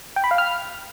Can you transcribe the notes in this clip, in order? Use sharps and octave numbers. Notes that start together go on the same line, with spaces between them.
G5
B5
F5
F6